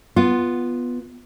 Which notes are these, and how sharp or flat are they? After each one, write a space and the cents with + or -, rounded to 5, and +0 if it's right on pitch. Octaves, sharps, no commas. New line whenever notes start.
B3 -5 F4 +0